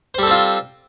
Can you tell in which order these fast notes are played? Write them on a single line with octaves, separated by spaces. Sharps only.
C5 G3 A4 C4 F4